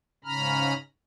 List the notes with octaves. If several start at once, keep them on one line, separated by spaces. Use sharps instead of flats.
G#2 C#3 C#4 A#5 B5 F6